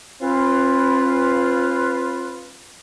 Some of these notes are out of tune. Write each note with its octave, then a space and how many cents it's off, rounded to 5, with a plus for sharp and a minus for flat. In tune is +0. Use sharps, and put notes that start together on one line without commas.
C4 +45 F4 +0 B4 +0